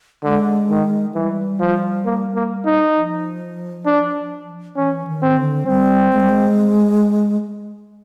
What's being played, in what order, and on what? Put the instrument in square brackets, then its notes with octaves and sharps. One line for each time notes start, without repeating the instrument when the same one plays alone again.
[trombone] D3 [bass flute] G#3
[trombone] D#3
[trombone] E3 [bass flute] G3
[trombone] F3
A#3
A#3
D#4
[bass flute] F3
[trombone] D4
[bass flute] E3 [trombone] C#4
[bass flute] D#3
[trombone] C4
[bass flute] D3
[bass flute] G3 [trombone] C4
[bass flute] G#3
G3
G#3